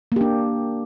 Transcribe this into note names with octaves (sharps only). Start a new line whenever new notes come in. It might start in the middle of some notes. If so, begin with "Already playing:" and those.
A#3 D4 G4